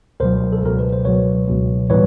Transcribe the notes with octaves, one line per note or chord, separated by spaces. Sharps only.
C#2 B2 F#3 A#4 C5
A4
C#2 B2 F#3 A#4
B4
C5
C#2 B2 F#3 B4 C#5
C#2 B2 F#3
A2 E3 G3 B4 C#5